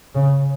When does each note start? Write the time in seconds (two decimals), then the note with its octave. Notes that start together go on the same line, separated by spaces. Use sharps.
0.15 C#3